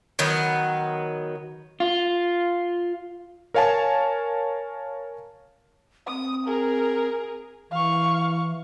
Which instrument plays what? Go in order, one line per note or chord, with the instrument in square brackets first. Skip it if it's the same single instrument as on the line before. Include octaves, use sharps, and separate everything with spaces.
[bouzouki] D#3 F#3 B3 B4
[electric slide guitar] F4
[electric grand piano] A#4 C#5 F5 G#5 A5
[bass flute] C4 [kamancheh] D#6
[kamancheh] G#4 A#4
[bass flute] E3 [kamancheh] F5 C#6